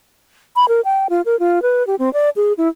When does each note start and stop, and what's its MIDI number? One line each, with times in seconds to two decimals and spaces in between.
0.56 0.65 83
0.69 0.81 70
0.85 1.07 79
1.10 1.22 65
1.26 1.38 70
1.39 1.62 65
1.62 1.85 71
1.87 1.95 67
1.99 2.12 60
2.13 2.30 74
2.36 2.53 68
2.58 2.68 64